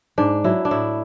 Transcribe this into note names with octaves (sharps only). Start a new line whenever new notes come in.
G#2 D4
F#3 E4
D4
A2 E4